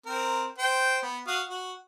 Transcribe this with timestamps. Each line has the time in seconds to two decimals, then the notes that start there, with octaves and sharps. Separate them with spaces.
0.06 C4 A#4
0.58 C5 G5
1.02 B3
1.27 F#4 F5 D#6
1.49 F#4